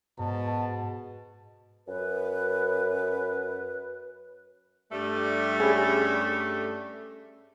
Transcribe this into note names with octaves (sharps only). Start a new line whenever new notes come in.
G#2 B2 A5
F#2 B4
G2 G3 A3
C#4 G#4 B5